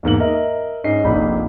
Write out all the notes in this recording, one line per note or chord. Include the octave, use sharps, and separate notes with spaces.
E2 G#2 A#3 F#7
A#4 D#5 E5
G#2 C#4 D#5 C7
F1 A#1 A#2 D#4 B5